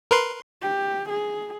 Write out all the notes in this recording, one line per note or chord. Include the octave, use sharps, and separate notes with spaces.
A#4 B4 C6
G4
G#4